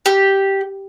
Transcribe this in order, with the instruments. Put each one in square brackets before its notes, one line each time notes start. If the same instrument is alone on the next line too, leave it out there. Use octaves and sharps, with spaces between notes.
[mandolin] G4